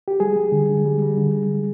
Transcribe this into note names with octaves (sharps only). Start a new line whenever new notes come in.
G4
G3 G#4
G3
D3
D3
G3
G3
D3
D3
G3